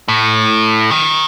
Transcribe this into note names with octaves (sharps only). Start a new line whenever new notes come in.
A2
D#3